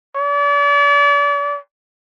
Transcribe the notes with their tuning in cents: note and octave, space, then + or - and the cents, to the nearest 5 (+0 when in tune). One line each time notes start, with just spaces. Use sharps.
D5 -40